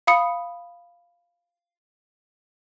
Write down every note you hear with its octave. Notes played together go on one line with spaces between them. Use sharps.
F5 B5 D#6 C#7